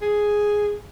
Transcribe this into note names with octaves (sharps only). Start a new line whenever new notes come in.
G#4